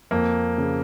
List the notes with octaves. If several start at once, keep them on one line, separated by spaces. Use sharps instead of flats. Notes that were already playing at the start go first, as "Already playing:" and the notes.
F2 A#3
C#3